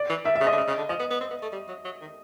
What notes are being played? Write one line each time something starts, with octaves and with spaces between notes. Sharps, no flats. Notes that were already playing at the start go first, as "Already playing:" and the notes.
Already playing: D5
E3
D#3 E5
E5
C#3
D#5
D3
C#3
C#3
D3
F3 D#5
B3
B3
C4
B3
A3
G3
F#3
F#3
D#3